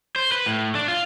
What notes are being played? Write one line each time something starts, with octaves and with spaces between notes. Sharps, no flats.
C5
B4
A2
D4
F4